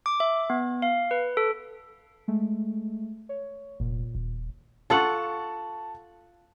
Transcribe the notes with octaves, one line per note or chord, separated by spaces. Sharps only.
D6
E5
B3
F5
B4
A4
G#3 A3
C#5
F1 A#2
D#1
F4 A4 F#5 A5 C#6